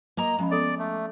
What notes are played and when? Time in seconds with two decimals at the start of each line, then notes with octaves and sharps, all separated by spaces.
0.17 A#3 D#5 A#5
0.39 F3 G#3 C#4 B5
0.51 B3 A4 D5 D#6
0.79 A3